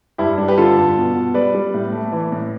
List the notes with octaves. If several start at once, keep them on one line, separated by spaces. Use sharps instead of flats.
G2 E4 G4
G3 D4
G4 B4
D3 F4 A4
G2
B2
B2
G3 B4 D5
G3
A2
A3
E3
A2